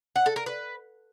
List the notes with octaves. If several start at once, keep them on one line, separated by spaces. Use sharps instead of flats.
F#5
A4
A#4
B4